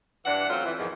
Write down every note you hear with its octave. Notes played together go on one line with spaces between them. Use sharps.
G2 E3 D4 F#5
F#3 A3 C4 C#4 F4
E3
E2 G#2 D#3 F3